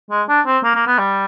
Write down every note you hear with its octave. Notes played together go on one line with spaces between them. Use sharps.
G#3
D4
C4
A#3
A#3
B3
G3